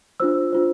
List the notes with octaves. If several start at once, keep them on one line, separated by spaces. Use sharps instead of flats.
D4 F4 C5 E6
D4 F4 C5